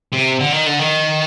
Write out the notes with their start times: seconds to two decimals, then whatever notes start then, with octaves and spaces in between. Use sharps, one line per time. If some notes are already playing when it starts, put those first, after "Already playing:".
0.13 C3
0.40 D3
0.53 D#3
0.67 D3
0.79 D#3